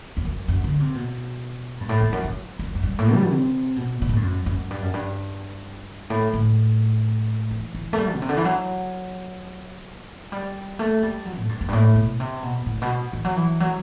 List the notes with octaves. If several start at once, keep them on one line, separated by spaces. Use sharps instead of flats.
E2
F#2
F#2
D3
C3
B2
G2
A2
E2
F#2
F#2
F#2
F#2
G2
A2
G3
C3
B2
B2
A2
G2
F#2
F#2
G2
F#2
G2
A2
A2
E3
E3
A3
G3
B2
C3
D3
E3
F#3
G3
A3
G3
F#3
A2
G2
F#2
G2
A2
B2
C3
B2
A2
B2
E3
F#3
E3
F#3